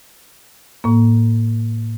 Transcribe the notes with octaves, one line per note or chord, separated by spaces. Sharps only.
A2 A#3